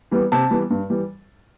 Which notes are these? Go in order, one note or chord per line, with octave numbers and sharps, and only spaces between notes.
E3 G3 B3
C3 A5
E3 G3 B3
G2
E3 G3